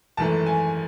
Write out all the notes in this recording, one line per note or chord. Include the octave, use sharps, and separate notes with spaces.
G#1 F#2 E3 A3 A5
G#5